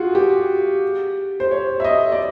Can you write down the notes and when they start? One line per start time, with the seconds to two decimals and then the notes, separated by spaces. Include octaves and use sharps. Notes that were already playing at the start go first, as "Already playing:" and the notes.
Already playing: F4 F#4 G#4
0.15 G4
1.40 C5
1.51 C#5
1.80 E5
1.84 D#5
2.12 D5